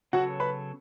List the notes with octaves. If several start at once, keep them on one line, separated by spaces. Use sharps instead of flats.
C#3 F#3 B3 F#4 A4 C#5 F#5
B4 B5